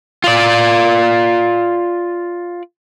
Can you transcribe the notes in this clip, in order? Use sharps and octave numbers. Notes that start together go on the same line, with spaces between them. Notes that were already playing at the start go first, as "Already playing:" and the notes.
F4 D5